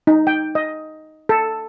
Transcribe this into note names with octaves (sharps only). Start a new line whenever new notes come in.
D#4
G5
D#5
A4